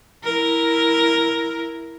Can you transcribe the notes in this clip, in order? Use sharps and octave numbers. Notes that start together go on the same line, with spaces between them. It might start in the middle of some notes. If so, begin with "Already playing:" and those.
E4 A#4